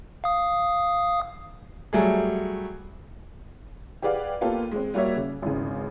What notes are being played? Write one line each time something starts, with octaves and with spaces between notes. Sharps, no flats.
F5 D#6
F#3 G3 A3 G#4
G4 G#4 B4 D5 F5 F#5
A#3 B3 F4 G4 A4
G#3 C4
G3 A#3 F#4 C#5 E5
C#3
G#1 E2 C#3